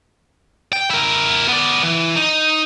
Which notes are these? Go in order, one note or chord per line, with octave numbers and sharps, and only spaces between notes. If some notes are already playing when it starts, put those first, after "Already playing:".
G5
E4 A#4
B3 D5
E3
D#4